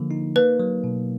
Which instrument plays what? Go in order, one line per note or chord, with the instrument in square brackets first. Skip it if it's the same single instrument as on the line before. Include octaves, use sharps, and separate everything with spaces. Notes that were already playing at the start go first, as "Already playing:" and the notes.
Already playing: [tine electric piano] D3 F3 A#3
D#4
[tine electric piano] A#3 [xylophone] B4
[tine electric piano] F#3
B2